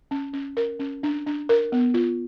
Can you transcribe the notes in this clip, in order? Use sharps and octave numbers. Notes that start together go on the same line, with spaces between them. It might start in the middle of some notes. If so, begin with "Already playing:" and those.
C#4
C#4
A#4
C#4
D4
D4
A#4
B3
F4